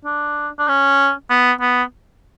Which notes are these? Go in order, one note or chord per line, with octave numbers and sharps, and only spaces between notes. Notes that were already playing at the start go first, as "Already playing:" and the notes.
D4
D4
C#4
B3
B3